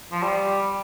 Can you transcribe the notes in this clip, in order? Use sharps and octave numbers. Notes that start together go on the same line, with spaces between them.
F3
G3